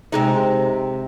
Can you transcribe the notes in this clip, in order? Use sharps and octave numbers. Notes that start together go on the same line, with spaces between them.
C3 G#3 D#4